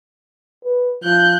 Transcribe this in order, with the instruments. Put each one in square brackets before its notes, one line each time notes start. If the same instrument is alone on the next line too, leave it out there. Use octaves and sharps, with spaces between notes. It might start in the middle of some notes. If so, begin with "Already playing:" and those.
[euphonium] B4
[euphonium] F3 [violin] F#6 G6